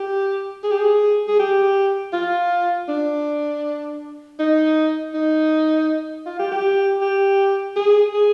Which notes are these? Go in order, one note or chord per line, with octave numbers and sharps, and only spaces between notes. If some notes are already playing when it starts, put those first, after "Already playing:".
Already playing: G4
G#4
G4
G#4
G#4
G4
F4
D4
D#4
D#4
F4
G4
G4
G4
G#4
G#4